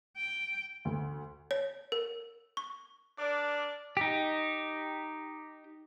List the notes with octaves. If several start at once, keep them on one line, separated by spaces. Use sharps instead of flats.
G5
D2
C#5
A#4
C#6
D4 A#4 D5
D#4 G4